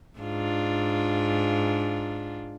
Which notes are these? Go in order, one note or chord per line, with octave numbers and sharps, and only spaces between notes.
G#2 D4 F4